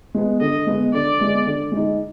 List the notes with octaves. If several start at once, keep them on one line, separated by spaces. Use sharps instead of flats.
G#3 B3
D3 D#5
G#3 B3
D3 D5
G#3 B3
D3
G#3 D#4